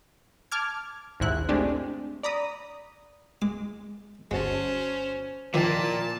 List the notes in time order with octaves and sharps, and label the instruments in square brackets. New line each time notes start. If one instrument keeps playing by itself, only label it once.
[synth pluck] A5 D6 F6 G#6
A#1 D#2 G#2 E4 F#6
G#3 A3 C4 D4 G4
D5 A#5 B5 D#6
[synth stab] G#3 [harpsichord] D6
[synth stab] G1 F#4 A5 [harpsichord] G#3 [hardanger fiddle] C#4 C5
[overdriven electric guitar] A#2 [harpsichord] D#3 F3 [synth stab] E4 [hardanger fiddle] A5